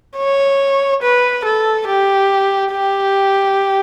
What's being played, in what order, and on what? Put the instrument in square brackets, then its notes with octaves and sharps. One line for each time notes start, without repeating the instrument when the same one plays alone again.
[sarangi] C#5
B4
A4
G4
G4